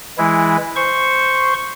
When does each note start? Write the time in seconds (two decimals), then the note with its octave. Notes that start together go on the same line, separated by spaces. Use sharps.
0.18 E3 G#3 E4
0.76 C5 C#6